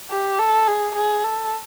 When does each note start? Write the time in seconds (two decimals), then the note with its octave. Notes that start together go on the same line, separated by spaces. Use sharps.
0.10 G4
0.39 A4
0.67 G#4
0.95 G#4
1.24 A4